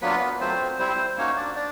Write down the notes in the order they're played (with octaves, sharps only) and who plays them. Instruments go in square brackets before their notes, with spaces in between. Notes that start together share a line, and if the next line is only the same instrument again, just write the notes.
[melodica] F#3 A#3 B3 D4 F4 B4
F#3 A3 C4 F4 C5
G3 C4 E4 C5
A#3 C#4 D#4 F#4 C#5
D4 D5
D4 D5